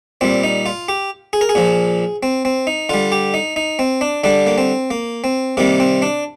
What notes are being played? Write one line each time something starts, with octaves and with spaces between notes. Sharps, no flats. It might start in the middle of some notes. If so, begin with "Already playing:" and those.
A#2 G3 C4
D#4
F4
G4
G#4
A#4
G#4
A#2 F3
C4
C4
D#4
D3 G3 F4
G4
D#4
D#4
C4
D4
D3 G3 D4
A#3
C4
A#3
C4
C3 D#3 G3 A#3
C4
D4